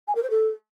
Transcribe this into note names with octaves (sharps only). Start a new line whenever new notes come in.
G#5
A#4
C5
A4